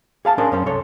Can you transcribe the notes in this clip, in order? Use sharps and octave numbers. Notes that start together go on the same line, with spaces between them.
G#4 F5 A5
C#4 D4 G#4 A#4 C5
F#2 C#4 C5
C2 A4 C#5 C6